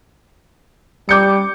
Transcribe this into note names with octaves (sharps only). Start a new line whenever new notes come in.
G3 D6 G6 C#7